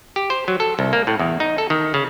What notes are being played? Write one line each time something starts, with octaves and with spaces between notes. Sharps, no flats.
G4
C5
F#3
A4
C2
A#3
A2
E2
D#4
A4
D#3
C#3